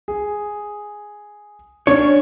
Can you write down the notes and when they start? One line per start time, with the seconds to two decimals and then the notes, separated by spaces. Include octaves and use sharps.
0.08 G#4
1.87 C#4 D4 C#5